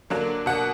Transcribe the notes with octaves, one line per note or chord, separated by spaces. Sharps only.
D3 F#3 A#3 D4
B2 A#3 D4 F#5